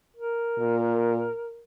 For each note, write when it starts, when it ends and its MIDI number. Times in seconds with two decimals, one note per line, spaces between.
0.17 1.62 70
0.59 1.26 46